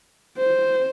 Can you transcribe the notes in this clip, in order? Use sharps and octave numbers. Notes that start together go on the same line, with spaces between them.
C5